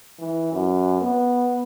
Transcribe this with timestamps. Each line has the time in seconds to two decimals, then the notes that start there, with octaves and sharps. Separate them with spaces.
0.19 E3
0.52 F#2
1.01 B3